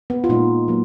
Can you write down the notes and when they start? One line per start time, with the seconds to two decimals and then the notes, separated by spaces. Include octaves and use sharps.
0.10 B3
0.24 F4
0.29 A#2 G#3 D#4
0.68 F#3 A#3